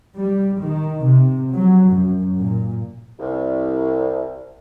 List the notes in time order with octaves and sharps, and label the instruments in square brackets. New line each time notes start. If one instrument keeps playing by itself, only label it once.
[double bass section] G3
D#3
C3
F#3
F#2
A#2
[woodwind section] C2